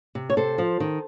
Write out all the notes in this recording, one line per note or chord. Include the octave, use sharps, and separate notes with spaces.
C3
C#5
C3 A4 C5
F3
D#3